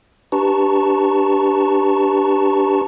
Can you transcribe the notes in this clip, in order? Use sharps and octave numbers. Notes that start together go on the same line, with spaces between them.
D4 G4 B4 A5 A#5 C#6